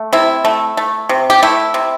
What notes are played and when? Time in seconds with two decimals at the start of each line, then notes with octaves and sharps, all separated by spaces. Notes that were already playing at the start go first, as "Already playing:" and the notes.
Already playing: A3
0.13 C3 E4
0.45 A3
0.77 A3
1.09 C3
1.30 G4
1.42 A3 E4
1.74 C3